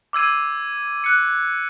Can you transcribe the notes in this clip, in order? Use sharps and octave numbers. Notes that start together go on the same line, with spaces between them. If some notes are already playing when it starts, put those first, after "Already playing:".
D6 E6 G#6 D#7
F#6 C#7